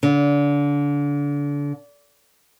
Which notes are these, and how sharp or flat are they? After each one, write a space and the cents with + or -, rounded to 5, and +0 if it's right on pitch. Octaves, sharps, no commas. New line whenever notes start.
D3 -30